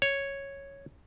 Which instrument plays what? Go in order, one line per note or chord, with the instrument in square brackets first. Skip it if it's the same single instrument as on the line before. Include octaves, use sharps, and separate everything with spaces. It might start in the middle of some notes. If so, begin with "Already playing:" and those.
[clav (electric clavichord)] C#5